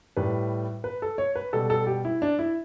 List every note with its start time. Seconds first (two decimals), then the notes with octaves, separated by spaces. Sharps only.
0.17 A2 G3 B4
0.84 B4
1.02 A4
1.18 C#5
1.36 B4
1.53 B2 G3 A4
1.70 A4
1.87 G4
2.05 E4
2.22 D4
2.39 E4